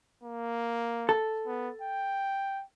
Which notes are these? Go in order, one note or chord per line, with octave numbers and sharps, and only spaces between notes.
A#3
A4
B3
G5